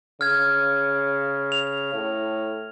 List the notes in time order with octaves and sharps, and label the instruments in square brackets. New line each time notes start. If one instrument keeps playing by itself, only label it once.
[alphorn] C#3 [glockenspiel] F6 G#6
[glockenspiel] F7
[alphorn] A2